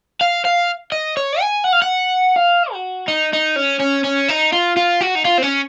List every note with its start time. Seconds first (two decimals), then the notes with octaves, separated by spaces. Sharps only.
0.21 F5
0.45 F5
0.92 D#5
1.17 C#5
1.41 G#5
1.64 F#5
1.73 F5
1.82 F#5
2.36 F5
2.73 F#4
3.08 D#4
3.33 D#4
3.56 C#4
3.80 C#4
4.05 C#4
4.29 D#4
4.53 F4
4.77 F4
5.01 F#4
5.15 D#4
5.25 F4
5.38 C4
5.42 C#4